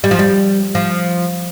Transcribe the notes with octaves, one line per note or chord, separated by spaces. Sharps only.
G3
F3
G3
F3